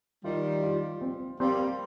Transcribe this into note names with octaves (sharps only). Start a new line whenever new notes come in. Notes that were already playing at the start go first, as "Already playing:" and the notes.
D#3 G3 F4
F4
C4
G3 A#3 C4